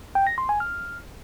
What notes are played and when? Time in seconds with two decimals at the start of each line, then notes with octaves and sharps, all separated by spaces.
0.15 G5
0.27 A#6
0.38 C6
0.49 G#5
0.60 F6